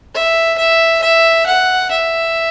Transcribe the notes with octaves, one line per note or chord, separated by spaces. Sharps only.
E5
E5
E5
F#5
E5